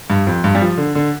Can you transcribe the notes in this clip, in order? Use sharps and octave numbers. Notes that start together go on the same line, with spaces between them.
G2
F2
G2
G3
F3
D3
D3